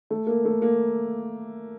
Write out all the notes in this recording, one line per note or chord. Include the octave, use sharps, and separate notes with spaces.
A3
A#3
A3
A#3